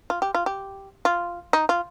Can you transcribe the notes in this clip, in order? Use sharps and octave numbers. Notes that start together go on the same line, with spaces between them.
F4
G4
F4
G4
F4
D#4
F4